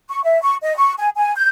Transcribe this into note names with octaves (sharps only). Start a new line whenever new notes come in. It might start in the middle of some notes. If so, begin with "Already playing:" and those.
C#6
E5
C#6
D#5
C#6
G#5
G#5
G6